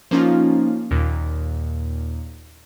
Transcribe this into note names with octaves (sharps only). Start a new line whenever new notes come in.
F3 A#3 C#4 D#4 F4
D#2 A#2